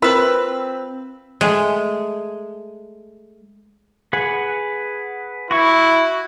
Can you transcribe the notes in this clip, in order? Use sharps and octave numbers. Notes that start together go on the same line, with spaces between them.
C4 F4 A#4 B4 B5 E6
G#3 A3
G#4 B4 F#5
E4 F#4 C#6